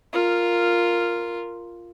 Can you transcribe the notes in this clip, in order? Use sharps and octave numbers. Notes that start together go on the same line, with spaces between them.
F4 A#4